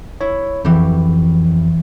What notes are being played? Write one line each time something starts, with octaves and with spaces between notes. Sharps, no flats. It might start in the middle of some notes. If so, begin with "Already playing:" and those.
E4 C#5
F2 E3 F#3 G4